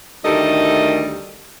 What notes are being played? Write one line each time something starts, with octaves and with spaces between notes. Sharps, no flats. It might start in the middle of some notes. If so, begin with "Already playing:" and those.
D2 D#3 G3 A3 A4 D#5